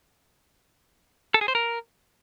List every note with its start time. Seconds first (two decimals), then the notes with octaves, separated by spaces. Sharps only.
1.34 A4
1.41 G#4
1.48 C5
1.55 A#4